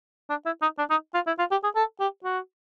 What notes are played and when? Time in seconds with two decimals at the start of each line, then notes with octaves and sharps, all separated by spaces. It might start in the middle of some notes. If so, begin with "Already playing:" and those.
0.30 D4
0.46 E4
0.62 D#4
0.78 D4
0.90 D#4
1.14 F4
1.27 E4
1.39 F4
1.51 G4
1.63 G#4
1.75 A4
2.00 G4
2.24 F#4